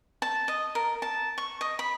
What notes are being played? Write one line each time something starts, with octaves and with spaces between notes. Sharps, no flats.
A5
D#5
A#4
A5
C#6
D#5
B5